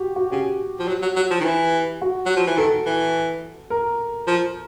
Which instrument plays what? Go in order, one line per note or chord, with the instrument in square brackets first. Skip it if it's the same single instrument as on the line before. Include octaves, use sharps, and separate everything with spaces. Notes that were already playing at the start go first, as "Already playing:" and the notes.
Already playing: [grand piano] F#4 G4
F#4
[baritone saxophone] C#3 [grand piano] G4
[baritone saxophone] F3
F#3
F#3
F#3
F3
D#3
E3
[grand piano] F#4
[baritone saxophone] F#3
F3
E3
[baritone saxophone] D#3 [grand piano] A4
[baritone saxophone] E3
[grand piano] A#4
[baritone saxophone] F3